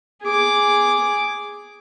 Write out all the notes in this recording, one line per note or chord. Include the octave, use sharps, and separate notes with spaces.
G#4 D6